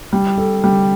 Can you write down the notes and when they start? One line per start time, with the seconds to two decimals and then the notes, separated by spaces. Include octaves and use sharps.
0.13 G3
0.38 A4
0.64 G3